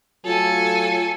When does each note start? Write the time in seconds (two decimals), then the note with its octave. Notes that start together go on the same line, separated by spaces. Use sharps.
0.25 F#3 A3 F4 A4 G#5